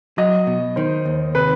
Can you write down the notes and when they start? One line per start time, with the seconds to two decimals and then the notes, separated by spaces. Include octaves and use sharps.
0.18 F#3 D#5
0.47 B2
0.76 D#3 C5
1.05 D#2
1.35 C3 B4